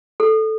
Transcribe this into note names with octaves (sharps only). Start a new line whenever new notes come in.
A4